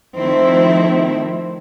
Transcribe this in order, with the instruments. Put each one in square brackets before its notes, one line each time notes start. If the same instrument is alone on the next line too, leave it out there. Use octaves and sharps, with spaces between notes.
[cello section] D#3 F3 A3 C4 E4